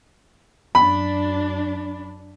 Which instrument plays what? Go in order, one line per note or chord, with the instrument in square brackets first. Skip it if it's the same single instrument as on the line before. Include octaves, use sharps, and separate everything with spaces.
[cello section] F#2 D4 [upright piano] B5